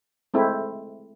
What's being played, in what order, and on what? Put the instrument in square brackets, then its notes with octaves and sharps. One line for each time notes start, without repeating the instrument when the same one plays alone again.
[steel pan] G#3 A3 C4 E4